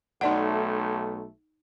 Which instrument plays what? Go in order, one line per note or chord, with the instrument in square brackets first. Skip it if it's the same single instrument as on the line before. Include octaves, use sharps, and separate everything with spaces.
[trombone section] B1 A3 [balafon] D#4 D5 F#5